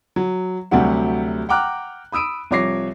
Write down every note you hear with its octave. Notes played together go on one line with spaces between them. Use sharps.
F#3
D2 C3 F#3 G3 G4 F#5
F#5 G5 A#5 D6 F6 F#6
B5 D#6 E6 D7 D#7
C2 F3 C#5 D6 A#6 C7